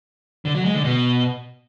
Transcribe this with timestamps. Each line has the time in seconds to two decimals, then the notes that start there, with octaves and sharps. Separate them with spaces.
0.45 D3
0.55 F#3
0.65 G#3
0.75 D3
0.84 B2